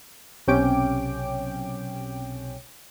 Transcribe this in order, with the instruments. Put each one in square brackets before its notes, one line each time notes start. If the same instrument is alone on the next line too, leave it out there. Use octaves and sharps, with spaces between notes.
[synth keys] B1 C3 C#4 G5 D6 D7